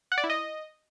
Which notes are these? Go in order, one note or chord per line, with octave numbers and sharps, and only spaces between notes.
F#5
D5
E4
D#5